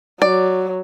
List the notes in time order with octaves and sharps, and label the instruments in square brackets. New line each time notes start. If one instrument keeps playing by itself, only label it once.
[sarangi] F#3 [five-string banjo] D5